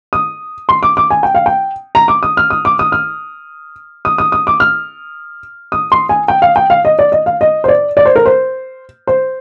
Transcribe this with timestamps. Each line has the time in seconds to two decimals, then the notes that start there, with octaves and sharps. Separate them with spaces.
0.13 D#6
0.69 C6
0.83 D6
0.97 D6
1.10 G#5
1.23 G5
1.35 F5
1.46 G5
1.95 A#5
2.08 D6
2.23 D#6
2.37 F6
2.50 D#6
2.65 D6
2.79 D#6
2.92 F6
4.05 D#6
4.18 D#6
4.32 D#6
4.47 D6
4.60 F6
5.72 D#6
5.92 C6
6.09 G#5
6.28 G5
6.42 F5
6.56 G5
6.70 F5
6.85 D#5
6.99 D5
7.12 D#5
7.26 F5
7.41 D#5
7.64 C5
7.68 D5
7.97 D5
8.05 C5
8.16 A#4
8.26 C5
9.07 C5